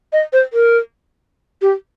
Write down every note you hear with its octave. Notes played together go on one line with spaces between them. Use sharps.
D#5
C5
A#4
G4